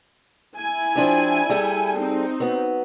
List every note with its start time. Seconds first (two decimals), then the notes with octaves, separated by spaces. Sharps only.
0.56 E4 G#5
0.96 F3 D4 G4
1.50 G3 G#4 A4
1.97 C4 D#4
2.40 F#3 B3